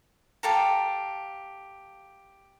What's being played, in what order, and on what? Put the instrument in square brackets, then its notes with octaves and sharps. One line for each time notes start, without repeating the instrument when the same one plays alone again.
[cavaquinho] G4 A4 F5 A#5